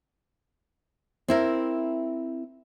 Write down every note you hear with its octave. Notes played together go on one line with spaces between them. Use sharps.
C4 E4 A#4